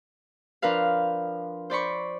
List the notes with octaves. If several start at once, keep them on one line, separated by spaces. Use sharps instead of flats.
F3 D4 A#4 B4 F5
C5 D5 B5 C#6